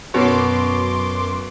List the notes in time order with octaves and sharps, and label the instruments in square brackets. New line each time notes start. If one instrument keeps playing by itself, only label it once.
[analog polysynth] F#2 C6 D6 [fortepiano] B2 C#5